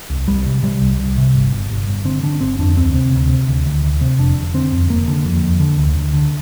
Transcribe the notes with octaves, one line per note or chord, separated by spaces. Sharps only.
C2
C2 G3
C3
C3 G3
C2
C2
C3
G1
G1
G1
G1
D3 C4
D3 D4
G1 C4
F2 D4
D2 C4
C3
D2
C3
D2
D2
D2
C3
F1 D4
F1
D3 C4
F2
F1 A#3
D3
F2
F2
D3
D2
D2
D3